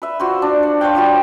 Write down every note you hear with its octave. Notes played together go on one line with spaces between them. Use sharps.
B4 E5
F4 F#4 C5
D4
F#5
C5 C#5 F5 G5
G3 F4 F#4 G5